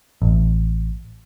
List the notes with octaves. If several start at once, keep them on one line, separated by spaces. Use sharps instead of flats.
A1